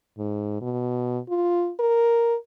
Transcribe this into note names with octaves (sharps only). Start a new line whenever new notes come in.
G#2
B2
F4
A#4